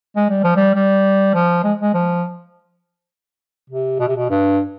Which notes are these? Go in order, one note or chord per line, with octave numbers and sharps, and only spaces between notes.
G#3
G3
F3
G3
G3
F3
G#3
G#3
F3
C3
B2
C3
B2
G2